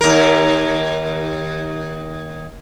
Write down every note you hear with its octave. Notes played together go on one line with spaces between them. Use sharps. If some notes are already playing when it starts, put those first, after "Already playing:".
D#2 A#4